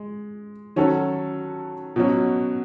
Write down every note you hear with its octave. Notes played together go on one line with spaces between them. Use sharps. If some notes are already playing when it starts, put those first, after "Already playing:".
Already playing: G#3
D#3 F#3 C#4 F#4 A4
B2 F#3 C#4